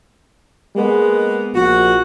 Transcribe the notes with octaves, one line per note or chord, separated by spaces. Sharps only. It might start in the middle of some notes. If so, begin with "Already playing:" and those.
G#3 A#3 B3
A#1 F#4